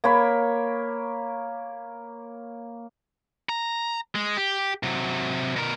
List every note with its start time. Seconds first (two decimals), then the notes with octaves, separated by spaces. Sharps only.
0.04 A#3 C#5 B5
3.49 A#5
4.15 G#3
4.37 G4
4.83 C3 F#3
5.56 B2 A#4